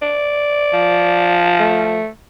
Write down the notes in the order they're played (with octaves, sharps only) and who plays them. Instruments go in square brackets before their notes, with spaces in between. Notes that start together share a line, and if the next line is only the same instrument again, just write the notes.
[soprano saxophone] D5
[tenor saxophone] F3
[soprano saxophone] A3